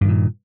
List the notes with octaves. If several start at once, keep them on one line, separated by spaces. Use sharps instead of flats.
G2 A#2 D#3